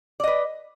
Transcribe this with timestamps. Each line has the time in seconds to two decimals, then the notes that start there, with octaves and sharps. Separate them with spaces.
0.20 D5
0.24 D#5
0.27 B4